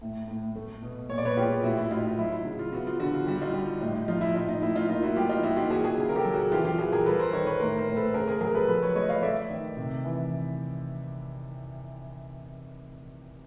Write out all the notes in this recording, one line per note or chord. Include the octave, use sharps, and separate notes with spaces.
A2
A2
A3
B2
A#2 C#5
D5
B4 C#5
G#3 F4 G4
A2 E4 F#4
E4 F#4
A2 D#4 F4
F#3 E4
E4
C#3
F4
B3 F#4
F4
D3 F#4
F4
G3 F#4
D#4 F4
G3
A2 D#4
F3 D#4 F4
E4
A2 D#4 F4
D#4
A2 E4
D#4 F4
A#3 D#4 F4
E4 F#4
G3 F4 G4
D#4 F4
A#3 E4 F#4
F4 G4
D#3 F#4 G#4
F#4 G#4
C#3
A#4
G4 A4
F#3
F#4 G#4
E3 F4 G4
F4 G4
E3 F#4 G#4
G#4 A#4
G3 A4 B4
A#4 C5
D#3 B4 C#5
B4 C#5
A2 A#4 C5
A#4 C5
A2
A4 B4
C#3 G#4 A#4
G#4 A#4
F#3 G#4 A#4
A4 B4
F3 A4 B4
B4 C#5
A3 C#5 D#5
D#5 F5
A3 D5 E5
D#3
C3
E3